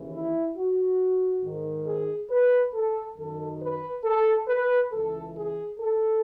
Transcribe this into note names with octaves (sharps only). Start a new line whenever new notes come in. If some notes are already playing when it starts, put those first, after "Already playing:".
Already playing: D#2 C#3 E3
E4
F#4
G#2 D#3
G#4
B4
A4
F#2 D#3 A4
B4
A4
B4
C#2 C#3 E3 A4
G#4
A4